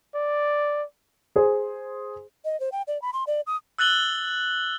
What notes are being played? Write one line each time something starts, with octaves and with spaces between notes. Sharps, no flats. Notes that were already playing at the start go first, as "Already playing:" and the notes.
D5
G#4 C5
D#5
C5
G5
D5
B5
C6
D5
D#6
E6 F#6 A6 F#7 G7